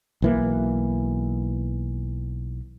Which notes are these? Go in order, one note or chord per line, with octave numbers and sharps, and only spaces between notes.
B1 E3 A#3